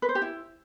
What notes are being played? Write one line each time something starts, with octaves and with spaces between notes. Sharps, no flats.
B4
C5
G4
E4